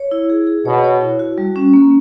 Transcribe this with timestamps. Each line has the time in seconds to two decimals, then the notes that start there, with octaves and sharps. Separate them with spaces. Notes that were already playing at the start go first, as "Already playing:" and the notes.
Already playing: C#5
0.11 E4
0.30 G#4
0.47 G#4
0.65 B2 C#5
0.84 C#5
1.01 E4
1.19 F#4
1.38 G3
1.56 C#4
1.74 A#3